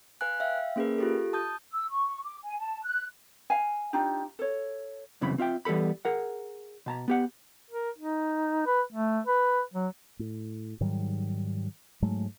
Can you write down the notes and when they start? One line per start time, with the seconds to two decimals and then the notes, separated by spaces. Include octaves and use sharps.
0.21 B4 F5 G#5 F#6
0.40 E5 F5 G5
0.76 A#3 C#4 G#4 A#4 B4
0.98 F4 G4 A4
1.33 A5 D#6 G6
1.73 E6
1.90 C#6
2.24 D6
2.44 G#5
2.59 A5
2.83 F#6
3.50 F5 G#5
3.93 D4 D#4 F4 G4
4.39 A4 C#5
5.21 C2 F#2 C#3 E3 C4 B5
5.38 C4 F4 E5 G5
5.65 E3 G3 B3 A4 B5
6.05 G#4 A#4 F#5
6.86 B2 A5 A#5
7.08 B3 G4 F#5
7.71 A#4
7.99 D#4
8.66 B4
8.93 A3
9.27 B4
9.74 F#3
10.19 A2
10.81 G#2 D#3 F#3 G3
12.02 G#2 F#3 G#3 A3